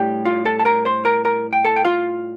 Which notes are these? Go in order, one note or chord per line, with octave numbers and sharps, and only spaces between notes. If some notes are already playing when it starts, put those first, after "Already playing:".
Already playing: A2 G3 D4 G4 G5
F4 F5
A4 A5
A5
A#4 A#5
C5 C6
A#4 A#5
A#4 A#5
G5
A4 A5
G5
F4 F5